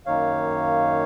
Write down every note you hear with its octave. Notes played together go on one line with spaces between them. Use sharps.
F#2 D#3 A#3 D#4 C#5 F5